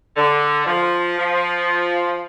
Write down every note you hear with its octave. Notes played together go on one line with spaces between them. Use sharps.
D3
F3
F3